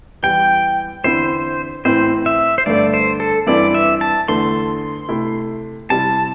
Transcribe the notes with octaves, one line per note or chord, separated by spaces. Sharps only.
E2 E3 G3 G5
E2 D3 C4 E4 C5
A2 E3 C4 E4 C5
E5
C5
G2 D3 A3 D5
C5
A4
G2 E3 C4 E4 D5
E5
A5
E2 D3 A3 C6
C3 A3 E4
C3 G3 C4 E4 A5